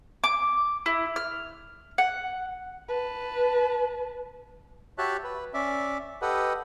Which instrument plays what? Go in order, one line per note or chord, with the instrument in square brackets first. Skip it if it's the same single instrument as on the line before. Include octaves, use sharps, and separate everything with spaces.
[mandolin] D6
E4
F6
F#5
[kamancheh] B4 A5
[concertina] F#4 G4 C#5 E5 A5 F#6
B4
C#4 D5 E5
G4 A4 B4 D#5 F#5